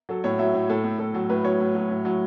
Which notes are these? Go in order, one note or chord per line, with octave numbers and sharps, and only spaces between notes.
F#3 A4
A2 C#5
F#3 E5
A2
A2 A4
A2
A2 A4
F#3
A2 B4
F#3 C#5
A2
F#3
A2
F#3